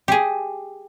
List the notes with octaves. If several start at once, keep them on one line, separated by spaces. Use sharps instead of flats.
G4 G#4